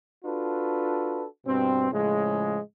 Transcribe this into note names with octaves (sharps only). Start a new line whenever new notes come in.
D4 F4 F#4 A4 B4
G2 B2 C4
A2 C#3 F3 G#3